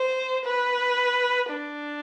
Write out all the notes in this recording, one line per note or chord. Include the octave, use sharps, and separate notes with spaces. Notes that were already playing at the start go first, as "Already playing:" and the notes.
Already playing: C5
B4
D4